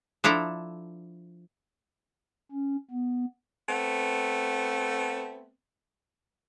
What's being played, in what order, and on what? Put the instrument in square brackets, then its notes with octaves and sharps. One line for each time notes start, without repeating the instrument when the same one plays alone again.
[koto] F3 D4 E4 A4 A#5
[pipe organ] C#4
B3
[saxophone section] A3 B3 C4